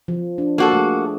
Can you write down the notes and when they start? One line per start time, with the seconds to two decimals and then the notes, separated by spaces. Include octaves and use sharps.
0.08 F3
0.38 D4
0.58 A#3 F#4 A4
0.73 A3 G#4